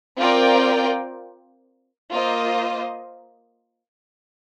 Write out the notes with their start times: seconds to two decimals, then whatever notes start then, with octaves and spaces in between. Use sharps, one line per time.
0.18 C4 F4 A#4 D5 G5
2.11 A#3 F4 C5 D#5